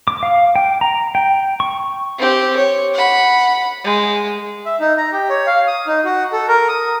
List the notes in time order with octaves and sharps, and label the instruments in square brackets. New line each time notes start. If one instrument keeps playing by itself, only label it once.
[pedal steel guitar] D6
F5
G5
A#5
G5
C#6
[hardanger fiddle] C4 G4
C#5
F#5 B5
G#3
[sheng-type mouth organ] E5
D#4
A#5
G4
C#5
F5
D#6
D#4
F#4
A4
A#4
D#6